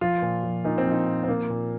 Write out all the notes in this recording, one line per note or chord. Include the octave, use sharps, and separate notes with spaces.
F3 F4
A#2
F3
A#2 D#4
C4
F3
D#4
A#2
C4
F3 A#3
A#2